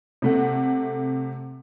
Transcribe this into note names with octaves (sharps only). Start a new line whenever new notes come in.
C3 A3 F#5